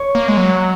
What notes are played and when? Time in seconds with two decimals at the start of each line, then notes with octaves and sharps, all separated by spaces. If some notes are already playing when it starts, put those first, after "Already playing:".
Already playing: C#5
0.15 A#3
0.28 G#3
0.37 F#3